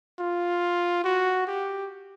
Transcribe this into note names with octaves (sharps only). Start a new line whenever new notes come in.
F4
F#4
G4